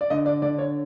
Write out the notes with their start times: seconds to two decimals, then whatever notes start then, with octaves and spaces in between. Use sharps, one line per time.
0.01 D5
0.10 D3 D#5
0.26 D5
0.42 D3 D5
0.59 C#5